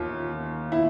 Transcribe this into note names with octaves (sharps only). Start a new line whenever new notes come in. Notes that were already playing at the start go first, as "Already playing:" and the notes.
Already playing: D#2 F4
E4